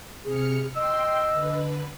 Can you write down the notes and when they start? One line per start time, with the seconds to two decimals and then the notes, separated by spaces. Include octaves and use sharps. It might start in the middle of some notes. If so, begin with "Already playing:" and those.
0.25 C3 G#4 F6 C#7
0.75 D#5 G5 C6 E6
1.31 D3 B4